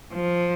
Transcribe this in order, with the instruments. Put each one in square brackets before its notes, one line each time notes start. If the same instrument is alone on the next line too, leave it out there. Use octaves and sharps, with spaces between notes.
[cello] F3